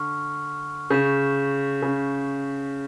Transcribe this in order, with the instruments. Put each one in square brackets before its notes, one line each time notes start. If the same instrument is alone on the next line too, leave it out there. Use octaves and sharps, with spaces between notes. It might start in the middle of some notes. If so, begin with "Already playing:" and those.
Already playing: [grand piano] D3 [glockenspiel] C#6 F6
[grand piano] C#3 [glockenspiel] G6 B6 E7
[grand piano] C#3